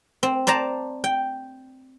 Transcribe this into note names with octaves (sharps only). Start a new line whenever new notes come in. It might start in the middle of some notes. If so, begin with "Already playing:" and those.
C4
C5 D5 A5 A#5
G5